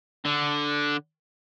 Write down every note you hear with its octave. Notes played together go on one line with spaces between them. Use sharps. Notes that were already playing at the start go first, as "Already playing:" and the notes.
D3